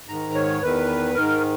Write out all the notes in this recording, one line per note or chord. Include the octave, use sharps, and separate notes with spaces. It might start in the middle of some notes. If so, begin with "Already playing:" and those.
G#2 D#3 A#5
C#5
E2 D#3 B4
G#2 D#3 A#4